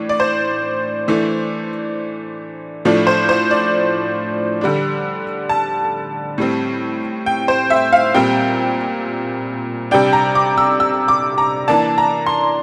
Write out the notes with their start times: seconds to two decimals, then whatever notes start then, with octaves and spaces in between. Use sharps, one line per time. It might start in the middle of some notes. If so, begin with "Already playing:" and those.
Already playing: A2 E3 D4
0.09 D5
0.20 C5
1.08 E3 A3 D4
2.85 A2 F3 A3 D4
3.07 C5
3.29 C5
3.51 D5
4.61 D3 G3 D4
5.49 A5
6.38 A2 G3 C4
7.26 G5
7.48 C5
7.70 E5
7.93 F5
8.15 A#2 G3 C4 G5
9.91 C3 G3 D4 G5
10.13 A#5
10.35 D6
10.58 E6
10.80 E6
11.08 D6
11.38 A#5
11.68 E3 A#3 D4 A5
11.98 A#5
12.27 C6